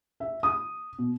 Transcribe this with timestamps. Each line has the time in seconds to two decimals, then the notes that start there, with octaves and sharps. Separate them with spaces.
0.20 E5
0.43 D#6
0.99 B2